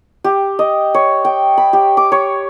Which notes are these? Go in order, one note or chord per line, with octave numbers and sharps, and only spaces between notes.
G4
D#5
C#5
G5
B5
G4
D6
C#5